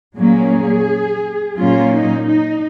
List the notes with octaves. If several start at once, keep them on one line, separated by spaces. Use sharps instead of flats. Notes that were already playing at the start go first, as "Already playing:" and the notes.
A#2 F#3 A#3 C#4 G#4
A#2 F#3 A#3 C#4 F4
D#4
D#4